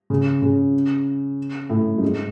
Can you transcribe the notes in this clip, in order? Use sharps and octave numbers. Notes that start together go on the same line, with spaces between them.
C#3
C#3
A2
F#2
G#2